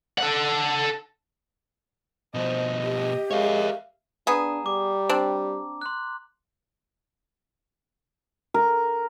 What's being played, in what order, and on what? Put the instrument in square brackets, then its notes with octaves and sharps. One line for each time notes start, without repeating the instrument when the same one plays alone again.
[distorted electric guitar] A4 F#5
[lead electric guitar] B2 F3 [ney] C5 [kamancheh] D#5
[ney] G4
[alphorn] G#3 [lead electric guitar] A#4 C#5 [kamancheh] E5 F5
[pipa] B3 G#4 [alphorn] D4 [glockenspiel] A#5
[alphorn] G3 [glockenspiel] D6
[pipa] C4 D4
[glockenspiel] C6 F#6
[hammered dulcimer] A#4